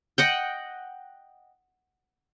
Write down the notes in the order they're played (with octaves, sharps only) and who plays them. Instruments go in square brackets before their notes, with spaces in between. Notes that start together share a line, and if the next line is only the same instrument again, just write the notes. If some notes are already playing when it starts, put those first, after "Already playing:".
[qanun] D#5 F#5 G5